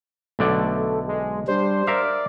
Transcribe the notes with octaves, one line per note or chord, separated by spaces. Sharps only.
B1 D3 A3 D5
G#3
G3 D4 C5
A#4 D5 E5 F5